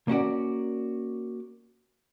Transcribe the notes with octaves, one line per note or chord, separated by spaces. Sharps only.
A#3 C#4 F#4 D5